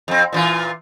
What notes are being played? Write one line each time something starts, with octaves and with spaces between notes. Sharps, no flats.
F2 C4
A#2 E3 F4